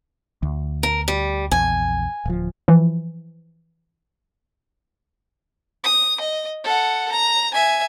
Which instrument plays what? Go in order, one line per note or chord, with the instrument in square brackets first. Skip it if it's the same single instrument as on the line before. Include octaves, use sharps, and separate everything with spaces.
[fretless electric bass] D2
[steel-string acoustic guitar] A#4
G3
[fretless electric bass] A#1 E2 [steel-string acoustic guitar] G#5
[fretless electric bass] D1 F3
[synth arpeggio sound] E3 F3
[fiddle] D#6
D#5
A4 F#5
A#5
E5 G#5